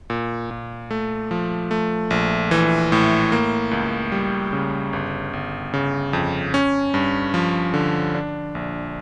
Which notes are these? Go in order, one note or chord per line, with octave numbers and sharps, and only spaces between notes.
A#2
A#2
A3
F3
A3
A#1
E3
A2
A#3
C#2
G3
C#3
G1
G1
C#3
F2
C#4
G2
F3
D3
D4
A#1